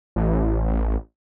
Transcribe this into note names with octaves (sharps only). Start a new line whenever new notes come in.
A1